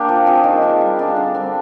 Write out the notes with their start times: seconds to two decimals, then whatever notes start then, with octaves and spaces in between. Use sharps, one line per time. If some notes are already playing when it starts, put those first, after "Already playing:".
Already playing: A#3 D4 G4
0.09 F3
0.26 C4 F4 G#4
0.44 D#3
0.62 A#3 D4
0.81 G3
0.99 D4 F4 G#4
1.16 D3
1.35 G3 C4